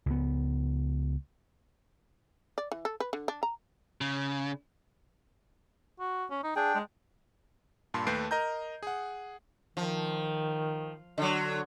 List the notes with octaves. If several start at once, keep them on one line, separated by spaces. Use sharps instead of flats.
C#2 B3
D5
E3
A4
B4
D3
D4
A#5
C#3
F#4
C#4
D#4
D4 G#4 G5
G#3
G2 A#2 A5 B5 C6
D#2 A3 B4 G6 C7 D7
A#4 D#5 A#5 G6
G#4 F#5
D#3 F3
D3 F#3